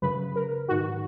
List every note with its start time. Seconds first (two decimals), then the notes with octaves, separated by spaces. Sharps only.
0.02 F#2 C#3 B4
0.36 A#4
0.69 G#2 D#3 F#4